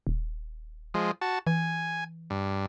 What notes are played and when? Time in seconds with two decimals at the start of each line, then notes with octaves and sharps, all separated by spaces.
0.07 D#1
0.94 F3 G#3
1.21 F#4 A5
1.47 E3 G#5
2.30 G2